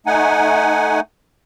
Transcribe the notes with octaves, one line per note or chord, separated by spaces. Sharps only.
A3 D#4 F#5 G#5